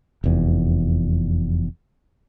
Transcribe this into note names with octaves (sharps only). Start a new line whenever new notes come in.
F1 E2